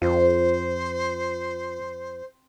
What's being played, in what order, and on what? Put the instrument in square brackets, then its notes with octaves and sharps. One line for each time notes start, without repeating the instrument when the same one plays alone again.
[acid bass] F2 [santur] C4 [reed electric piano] F4 [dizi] C5